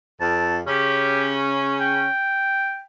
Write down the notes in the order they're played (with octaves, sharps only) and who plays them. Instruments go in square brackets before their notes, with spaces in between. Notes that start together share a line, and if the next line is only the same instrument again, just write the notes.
[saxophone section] F2 [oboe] A5
[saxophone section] C#3 C#4 [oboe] G4
[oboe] G5